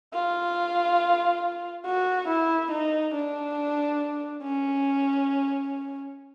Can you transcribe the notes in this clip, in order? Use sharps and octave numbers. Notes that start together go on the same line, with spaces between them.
F4
F#4
E4
D#4
D4
C#4